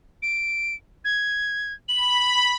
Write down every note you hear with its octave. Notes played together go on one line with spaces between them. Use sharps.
D7
G#6
B5 F#7